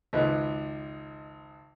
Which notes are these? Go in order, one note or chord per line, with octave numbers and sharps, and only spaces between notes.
G#1 C#2 B4 D#5